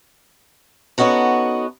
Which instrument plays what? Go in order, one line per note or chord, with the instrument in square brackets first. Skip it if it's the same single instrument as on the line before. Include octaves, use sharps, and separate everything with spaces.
[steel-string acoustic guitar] B3 C#4 D#4 F#4 A4